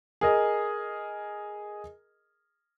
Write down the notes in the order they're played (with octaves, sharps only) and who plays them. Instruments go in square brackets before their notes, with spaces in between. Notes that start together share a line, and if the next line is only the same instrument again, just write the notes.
[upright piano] G#4 A#4 D#5